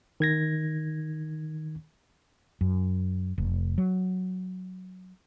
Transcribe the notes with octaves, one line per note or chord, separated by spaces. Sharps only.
D#3 G#6 A#6
F#2
F1
F#3